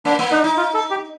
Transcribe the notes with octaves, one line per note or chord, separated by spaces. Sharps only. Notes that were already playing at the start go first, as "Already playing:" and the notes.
A#3 D4
A#3
D4 D#4
D#4
F4
A4
G4